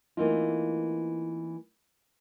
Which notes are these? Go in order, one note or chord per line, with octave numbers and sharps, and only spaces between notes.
E3 A3 A#3 C4 D#4 F4